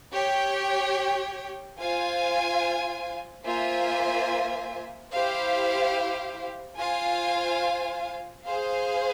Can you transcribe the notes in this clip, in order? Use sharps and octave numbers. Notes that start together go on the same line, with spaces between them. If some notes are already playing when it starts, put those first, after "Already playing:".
G4 C#5 G5
F4 C5 F5 G#5
A#3 F4 C5 E5 G#5
E4 G4 C5 F5
F4 C5 F5 G#5
G#4 C5 F5